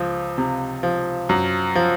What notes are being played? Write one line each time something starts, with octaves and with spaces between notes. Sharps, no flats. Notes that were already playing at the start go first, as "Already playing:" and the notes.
Already playing: C#2 F3
C3
F3
F#2
F3